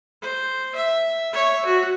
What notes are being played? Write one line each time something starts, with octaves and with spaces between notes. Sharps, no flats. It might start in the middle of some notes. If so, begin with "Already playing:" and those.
C5
E5
C#5 E5
F#4